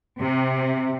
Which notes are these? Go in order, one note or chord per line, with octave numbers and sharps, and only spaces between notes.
C3